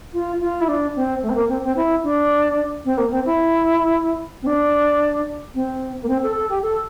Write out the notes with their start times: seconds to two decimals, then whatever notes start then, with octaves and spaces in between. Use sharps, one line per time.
0.13 F4
0.40 F4
0.60 E4
0.67 D4
0.95 C4
1.22 A3
1.29 C4
1.35 A#3
1.48 C4
1.62 C4
1.75 E4
2.03 D4
2.84 C4
2.97 A#3
3.10 C4
3.25 E4
4.41 C4
4.46 D4
5.54 C4
6.01 A#3
6.07 C4
6.22 A4
6.35 A4
6.48 G4
6.61 A4